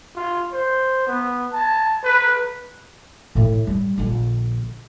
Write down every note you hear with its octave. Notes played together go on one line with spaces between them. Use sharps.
F4
C5
B3
A5
B4
A2 E4
G3
A#1 D3